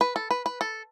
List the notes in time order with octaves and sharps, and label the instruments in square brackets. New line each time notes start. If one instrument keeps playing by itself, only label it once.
[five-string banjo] B4
A4
B4
B4
A4